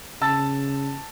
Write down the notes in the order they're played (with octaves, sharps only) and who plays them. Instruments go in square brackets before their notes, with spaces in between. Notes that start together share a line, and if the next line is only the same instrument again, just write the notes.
[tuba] C#3 [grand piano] A5 E6 A6